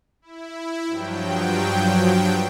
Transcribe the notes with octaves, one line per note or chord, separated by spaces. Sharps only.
E4
G2 F3 F#3 G5